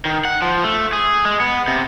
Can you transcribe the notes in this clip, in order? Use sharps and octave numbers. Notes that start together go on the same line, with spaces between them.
D#3
F#5
F3
A3
G#4
G#3
B3
C3